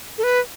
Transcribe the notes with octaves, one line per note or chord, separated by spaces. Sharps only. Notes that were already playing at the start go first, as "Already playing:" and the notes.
A4
B4